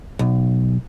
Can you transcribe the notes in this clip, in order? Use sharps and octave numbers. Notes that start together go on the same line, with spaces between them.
B1